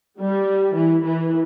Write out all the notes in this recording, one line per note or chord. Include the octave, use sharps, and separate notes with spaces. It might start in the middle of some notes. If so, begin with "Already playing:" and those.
G3
E3
E3